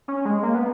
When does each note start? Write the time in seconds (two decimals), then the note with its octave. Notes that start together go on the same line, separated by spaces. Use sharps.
0.08 C#4
0.25 G#3
0.43 A#3
0.55 B3